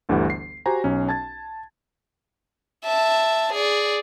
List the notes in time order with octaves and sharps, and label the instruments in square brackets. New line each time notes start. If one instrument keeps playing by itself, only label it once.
[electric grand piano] G1 D2 D3 E3 G4 F#5
C7
F#4 G4 C5 G#5 A#5
B1 C#4
A5 G#6 A6
[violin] E5 A5
G#4 D5